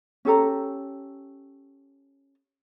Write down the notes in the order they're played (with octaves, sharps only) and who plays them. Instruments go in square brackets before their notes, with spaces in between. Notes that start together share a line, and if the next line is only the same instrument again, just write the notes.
[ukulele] C#4 G4 A4 A#5